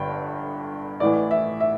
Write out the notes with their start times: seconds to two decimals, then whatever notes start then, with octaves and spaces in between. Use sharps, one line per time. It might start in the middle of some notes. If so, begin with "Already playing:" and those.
Already playing: G1 G2 D3 G5
1.00 A1 A2 E3 D5
1.31 E5
1.60 E5